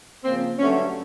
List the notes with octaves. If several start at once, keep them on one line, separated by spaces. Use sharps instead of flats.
C#3 F3 A#3 C4
G2 D3 F#3 A3 C#4